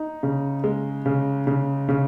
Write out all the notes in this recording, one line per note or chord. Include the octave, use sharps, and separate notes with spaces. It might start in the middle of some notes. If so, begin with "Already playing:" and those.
Already playing: D#4
C#3
G#3
C#3
C#3
C#3